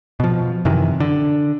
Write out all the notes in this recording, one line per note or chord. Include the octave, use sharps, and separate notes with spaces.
B2 F3
F#2 C3 D#3 E3
D3